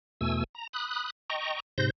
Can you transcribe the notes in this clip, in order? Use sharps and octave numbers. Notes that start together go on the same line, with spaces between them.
E2 B2 A3 G#5 E6
A#5
B5 D#6 F#6
D#5 G5 A#5 C#6
G#2 C3 C5 G6 A#6